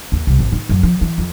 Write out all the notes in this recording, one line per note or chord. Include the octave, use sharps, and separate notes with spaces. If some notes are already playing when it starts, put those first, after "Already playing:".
D#2
C2
G#1
D#3
F#2
F3
E3
F2